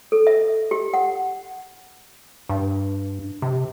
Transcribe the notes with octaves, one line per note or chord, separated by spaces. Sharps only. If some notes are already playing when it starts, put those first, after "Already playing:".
A4
E5
G4
F#5
G2
C3